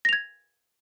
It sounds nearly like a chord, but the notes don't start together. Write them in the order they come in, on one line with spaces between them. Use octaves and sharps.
A#6 F7 G#6